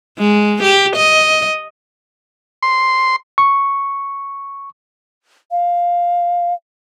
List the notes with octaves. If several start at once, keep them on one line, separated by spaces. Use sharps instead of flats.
G#3
G4
D#5
C6
C#6
F5